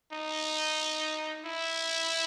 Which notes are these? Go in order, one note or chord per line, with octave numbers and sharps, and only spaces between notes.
D#4
E4